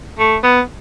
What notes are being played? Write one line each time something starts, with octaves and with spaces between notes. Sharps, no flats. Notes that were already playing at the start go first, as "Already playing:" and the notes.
A3
B3